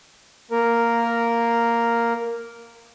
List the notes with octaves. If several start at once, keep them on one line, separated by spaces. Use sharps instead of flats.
A#3 A#4